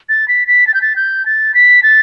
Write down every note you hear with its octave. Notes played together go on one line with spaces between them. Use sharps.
A6
B6
B6
A6
G6
A6
G6
A6
B6
A6